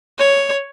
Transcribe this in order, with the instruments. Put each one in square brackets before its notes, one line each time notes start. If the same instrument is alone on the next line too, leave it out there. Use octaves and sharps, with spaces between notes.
[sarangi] C#5